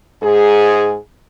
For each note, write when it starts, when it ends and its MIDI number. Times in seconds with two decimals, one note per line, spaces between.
0.23 0.97 44
0.23 0.97 68